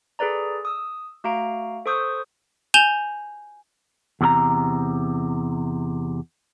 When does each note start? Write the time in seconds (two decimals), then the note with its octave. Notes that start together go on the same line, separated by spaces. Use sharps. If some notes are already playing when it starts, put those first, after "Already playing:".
0.19 G#4 A4 B4 D5 A#5
0.65 D#6 E6
1.24 A3 F#4 F5 A#5 D7
1.86 A4 C5 C#6 D#6 E6 G6
2.74 G#5 G6 E7 F7 G7
4.21 E2 C3 A4 A#5